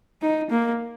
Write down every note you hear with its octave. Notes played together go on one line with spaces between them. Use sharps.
D#4
A#3